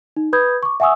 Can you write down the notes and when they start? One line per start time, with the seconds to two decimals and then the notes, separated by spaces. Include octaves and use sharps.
0.17 D#4
0.33 B4 B5 D#6 G6 G#6
0.63 C#6 D6
0.80 E5 F#5 G#5 C#6 D#6 E6